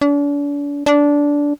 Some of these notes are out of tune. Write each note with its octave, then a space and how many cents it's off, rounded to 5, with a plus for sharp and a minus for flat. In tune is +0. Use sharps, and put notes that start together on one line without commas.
D4 -40
D4 -15